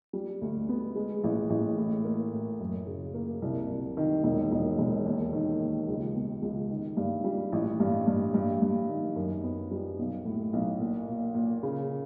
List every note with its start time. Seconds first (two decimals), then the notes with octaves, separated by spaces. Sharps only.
0.13 G3
0.41 D2
0.69 B3
0.95 G#3
1.24 A1
1.50 A1
1.78 A2
2.05 A#3
2.33 A2
2.60 F#2
2.87 C#3
3.14 A#3
3.42 C2
3.70 C2
3.97 D#3
4.23 E1
4.52 E1
4.78 E1
5.06 D#2
5.33 D#3
5.61 D#2
5.88 C#2
6.15 B2
6.42 C#2
6.70 D#3
6.97 G2
7.24 G3
7.52 A1
7.80 G2
8.07 G2
8.34 G2
8.62 G2
8.89 D#3
9.16 F#2
9.44 B3
9.71 G3
9.99 B1
10.25 A2
10.53 B1
10.80 A#2
11.08 A#2
11.34 A#2
11.63 C#3